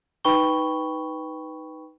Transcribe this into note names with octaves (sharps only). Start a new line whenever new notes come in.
D#4 B4 G5 B5 C#6 G7